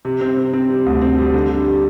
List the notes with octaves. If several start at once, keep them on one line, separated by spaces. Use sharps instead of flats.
C3
C4
C4
C4
G3
D2
C4
G3
D3
G3
G3